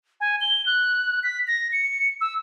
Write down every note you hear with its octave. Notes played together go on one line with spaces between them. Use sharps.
G#5
G7
F#6
B6
A#6
C#7
E6